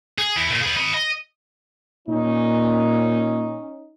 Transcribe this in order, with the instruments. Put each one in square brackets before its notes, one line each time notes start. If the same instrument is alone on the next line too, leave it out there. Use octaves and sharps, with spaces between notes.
[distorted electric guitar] G#4
E2 E4
A#2
G#4 B4
D#5 B5
D#5
[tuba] A#2 [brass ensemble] C#4 D#4